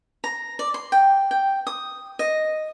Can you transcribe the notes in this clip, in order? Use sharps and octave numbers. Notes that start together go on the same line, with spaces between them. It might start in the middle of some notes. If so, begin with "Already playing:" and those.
A#5
D5
C6
G5
G5
D#6
D#5